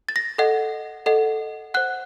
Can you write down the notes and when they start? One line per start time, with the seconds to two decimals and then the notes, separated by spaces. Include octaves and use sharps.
0.09 A6
0.16 A#6
0.38 A4 D#5 F#5
1.06 A4 D#5 F#5
1.74 C5 F#5 F#6